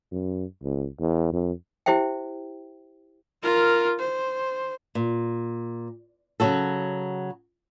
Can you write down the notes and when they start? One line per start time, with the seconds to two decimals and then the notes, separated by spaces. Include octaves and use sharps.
0.11 F#2
0.63 C#2
1.00 E2
1.32 F2
1.86 E4 G4 C5 E5 G5
3.43 F4 A#4
3.99 C5
4.95 A#2
6.40 C#3 F#3 F#4 A4